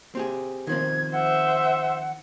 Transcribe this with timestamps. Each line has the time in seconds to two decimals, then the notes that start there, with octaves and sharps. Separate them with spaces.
0.15 C4 G4 G#4
0.67 D#3 F3 C4 G#6
1.13 C5 E5 F#5